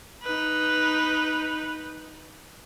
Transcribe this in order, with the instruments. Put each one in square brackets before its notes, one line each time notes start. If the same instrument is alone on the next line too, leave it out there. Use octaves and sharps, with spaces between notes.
[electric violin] D#4 B4